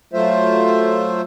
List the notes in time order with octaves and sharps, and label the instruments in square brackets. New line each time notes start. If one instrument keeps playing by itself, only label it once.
[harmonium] F#3 A3 F4 C5 E5